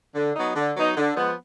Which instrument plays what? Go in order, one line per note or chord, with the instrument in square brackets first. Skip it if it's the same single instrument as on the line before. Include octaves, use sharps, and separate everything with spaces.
[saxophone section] D3
F#3 B3 D#4
D3
F#3 B3 D#4
D3
F3 G#3 B3